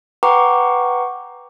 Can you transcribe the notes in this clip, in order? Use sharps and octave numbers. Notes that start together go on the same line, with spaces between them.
B4 F#5 G5 A#5 C#6 D6